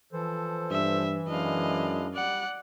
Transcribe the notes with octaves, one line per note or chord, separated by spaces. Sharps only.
E3 F3 A4 C5
G2 E5
F#2 G#3 D4 E4 D#5 F5
G3 D5 F#5